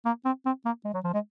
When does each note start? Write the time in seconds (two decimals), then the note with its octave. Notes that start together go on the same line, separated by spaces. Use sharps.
0.06 A#3
0.25 C4
0.45 C4
0.65 A#3
0.85 G#3
0.94 F#3
1.04 F3
1.14 G#3